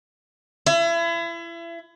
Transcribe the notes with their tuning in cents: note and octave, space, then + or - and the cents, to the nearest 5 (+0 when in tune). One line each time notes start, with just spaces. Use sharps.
E4 +35